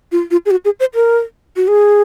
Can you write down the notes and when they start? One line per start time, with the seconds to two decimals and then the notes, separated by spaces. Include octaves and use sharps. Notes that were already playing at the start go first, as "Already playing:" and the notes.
0.12 F4
0.31 F4
0.46 G#4
0.51 F#4
0.65 G#4
0.80 C5
0.95 A#4
1.56 F#4
1.68 G#4